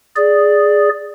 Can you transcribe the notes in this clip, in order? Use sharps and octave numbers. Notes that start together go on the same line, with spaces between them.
G#4 D5